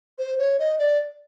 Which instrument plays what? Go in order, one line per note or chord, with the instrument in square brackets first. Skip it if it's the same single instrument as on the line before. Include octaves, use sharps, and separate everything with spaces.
[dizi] C5
C#5
D#5
D5